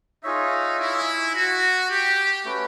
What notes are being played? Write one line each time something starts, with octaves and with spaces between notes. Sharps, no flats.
D#4 F4 G#4 C#5 E5
E4
F#4
G4
A3 C#4 F#4 B4